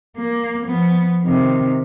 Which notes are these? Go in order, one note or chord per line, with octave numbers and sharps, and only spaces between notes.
A#3
F3 B3
C3 D#3